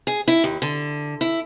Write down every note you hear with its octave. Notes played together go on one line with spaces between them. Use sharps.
G#4
E4
D#2
D3
E4